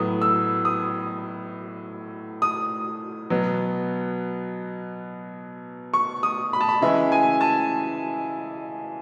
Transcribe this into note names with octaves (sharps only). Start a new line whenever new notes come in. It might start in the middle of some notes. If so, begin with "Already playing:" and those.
Already playing: A2 F#3 B3 D#6
E6
D#6
D#6
B2 F#3 B3
C#6
D#6
B5
A5
B5
C#3 E3 G#3 E5
G#5
A5